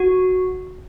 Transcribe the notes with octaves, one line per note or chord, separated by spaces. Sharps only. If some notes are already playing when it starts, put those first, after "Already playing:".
Already playing: F#4